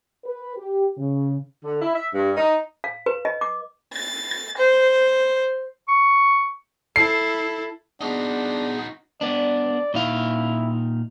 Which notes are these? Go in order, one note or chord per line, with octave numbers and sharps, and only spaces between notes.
B4
G4
C#3
D3
E4
E5
G2
D#4
F5
B4
D#5
D6
A6
C5
C#6
E4 A4 C7
B3 D4 D#4 F#4 G#4
B3 D4 D5
A#2 D#4 E4 F5